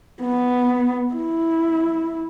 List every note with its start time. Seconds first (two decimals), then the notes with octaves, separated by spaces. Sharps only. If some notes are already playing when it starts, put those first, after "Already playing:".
0.21 B3
1.15 E4